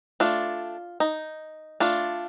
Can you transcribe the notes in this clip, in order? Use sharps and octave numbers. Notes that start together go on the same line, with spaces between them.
A3 D4 F4
D#4
A3 D4 F4